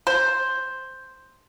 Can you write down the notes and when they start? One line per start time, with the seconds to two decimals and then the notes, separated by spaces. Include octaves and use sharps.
0.07 C5